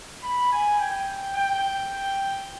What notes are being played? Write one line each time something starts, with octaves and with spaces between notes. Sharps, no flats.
B5
G#5
G5
G5